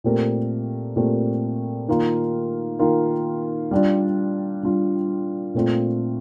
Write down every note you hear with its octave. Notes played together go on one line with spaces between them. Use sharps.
A#2 A3 C4 G4 A#4
A#2 A3 C4 G4 A#4
D#3 A#3 F4
D#3 A#3 F4
G3 D4 F4
G3 D4 F4
A#2 A3 C4 F4